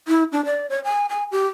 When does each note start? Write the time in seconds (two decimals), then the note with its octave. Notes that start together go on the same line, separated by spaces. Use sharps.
0.08 E4
0.32 D4
0.45 D5
0.70 C#5
0.84 G#5
1.09 G#5
1.31 G4